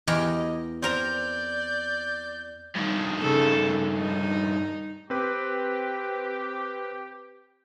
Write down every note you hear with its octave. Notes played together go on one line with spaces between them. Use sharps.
E2 G4 A#4 D#5
C4 A#4 D5 A#5 G6
G2 D#3
C#3 D#4 A4
D#4
C4 G4 B4